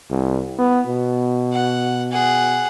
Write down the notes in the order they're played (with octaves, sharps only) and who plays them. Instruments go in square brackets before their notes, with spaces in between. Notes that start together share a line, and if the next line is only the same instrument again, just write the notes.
[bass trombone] C2
B3
B2
[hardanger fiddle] F#5
G#4 F#5